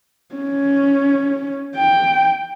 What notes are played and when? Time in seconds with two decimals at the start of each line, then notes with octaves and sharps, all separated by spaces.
0.35 C#4
1.75 G5